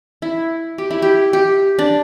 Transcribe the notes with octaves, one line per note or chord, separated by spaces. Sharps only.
E4
G4
E4
G4
G4
D4